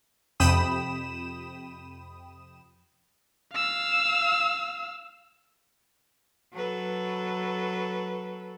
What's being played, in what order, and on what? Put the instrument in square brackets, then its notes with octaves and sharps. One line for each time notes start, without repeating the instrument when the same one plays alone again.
[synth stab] F2 C3 G5 B5 D#6 E7
[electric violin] F5 E6
[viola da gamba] F#3 A4 B4